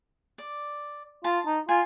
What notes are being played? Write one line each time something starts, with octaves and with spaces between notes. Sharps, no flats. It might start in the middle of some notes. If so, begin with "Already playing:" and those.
D5
F4 A5
D#4
F4 G#5